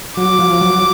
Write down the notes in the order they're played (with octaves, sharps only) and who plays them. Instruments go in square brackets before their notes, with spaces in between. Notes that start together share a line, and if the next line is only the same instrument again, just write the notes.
[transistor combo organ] F#3 [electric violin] D6
[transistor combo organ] F3
F#3